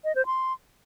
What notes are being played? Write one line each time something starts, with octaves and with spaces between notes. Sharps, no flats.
D#5
C5
C6